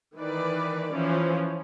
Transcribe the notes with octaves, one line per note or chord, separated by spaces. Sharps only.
D#3 E3 B4 D5
E3 F3 C#4